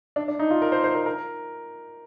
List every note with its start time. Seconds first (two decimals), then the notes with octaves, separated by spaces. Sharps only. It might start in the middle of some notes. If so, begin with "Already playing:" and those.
0.16 D4
0.28 D4
0.39 D#4
0.50 F4
0.62 A#4
0.72 C5
0.84 C5
0.95 A#4
1.06 A#4